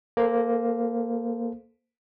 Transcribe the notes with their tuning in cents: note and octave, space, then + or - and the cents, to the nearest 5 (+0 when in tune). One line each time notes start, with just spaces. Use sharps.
A#3 +0 A4 -20 C5 -20